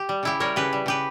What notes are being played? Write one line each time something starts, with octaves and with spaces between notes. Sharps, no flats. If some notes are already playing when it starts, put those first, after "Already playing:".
Already playing: G4
G3
C#3 E4 G4
G3 A#4 C#5
C#3 G4 B4
G3
C#3 G4 B4